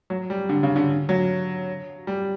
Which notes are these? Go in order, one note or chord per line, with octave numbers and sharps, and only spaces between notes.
F#3
G3
D3
C#3
D3
F#3
G3